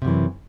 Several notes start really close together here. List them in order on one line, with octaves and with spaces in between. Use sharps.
C3 F#2 E3